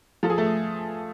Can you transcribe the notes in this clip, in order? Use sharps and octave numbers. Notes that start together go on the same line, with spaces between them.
F3 A4
G#4
A3 A4